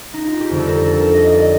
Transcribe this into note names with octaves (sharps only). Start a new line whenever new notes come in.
D#4
F4
G4
F2 D3 G3 A4
A#4
A4
A#4
D#5
D#5
D5
D#5